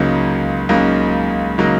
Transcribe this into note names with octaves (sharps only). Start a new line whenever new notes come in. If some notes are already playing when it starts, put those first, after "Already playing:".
Already playing: C#2 C#3 F#3 A#3 D#4
C#2 C#3 F#3 A#3 D#4
C#3 F#3 A#3 D#4